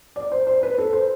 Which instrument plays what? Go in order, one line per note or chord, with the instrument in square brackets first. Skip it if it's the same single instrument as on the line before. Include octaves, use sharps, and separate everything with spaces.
[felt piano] D5
C5
C5
B4
A4
C5